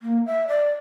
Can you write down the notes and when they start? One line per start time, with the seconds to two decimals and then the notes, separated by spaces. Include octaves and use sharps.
0.02 A#3
0.26 E5
0.48 D5